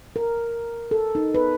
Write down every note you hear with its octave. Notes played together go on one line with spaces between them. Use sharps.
A#4
A4
D#4
B4